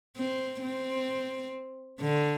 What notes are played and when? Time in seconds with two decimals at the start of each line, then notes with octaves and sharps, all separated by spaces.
0.17 C4
0.62 C4
2.01 D3